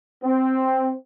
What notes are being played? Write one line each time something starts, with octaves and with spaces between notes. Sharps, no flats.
C4